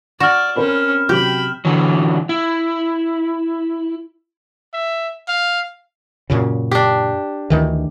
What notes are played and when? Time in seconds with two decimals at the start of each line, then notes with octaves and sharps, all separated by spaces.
0.20 F#4 D5 F6 E7
0.56 C4 C#4 A#4 C5 B5
1.09 C3 F#3 G4 G5 B5
1.65 D3 E3 F#3
2.29 E4
4.74 E5
5.28 F5
6.30 F#2 A#2 C#3
6.71 D4 G4
7.50 D2 D#3 E3